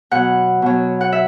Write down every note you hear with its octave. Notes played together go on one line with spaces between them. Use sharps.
B2 F#3 F#5
B2 F#3
F#5
E5